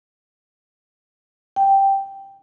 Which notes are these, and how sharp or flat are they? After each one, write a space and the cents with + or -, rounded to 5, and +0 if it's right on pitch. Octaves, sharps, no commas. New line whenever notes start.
G5 +0